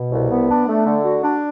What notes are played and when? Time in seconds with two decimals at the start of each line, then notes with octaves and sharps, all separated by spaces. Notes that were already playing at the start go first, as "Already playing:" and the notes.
Already playing: B2
0.11 C2
0.31 B3
0.49 D4
0.67 A3
0.86 D3
1.04 F#4
1.22 D4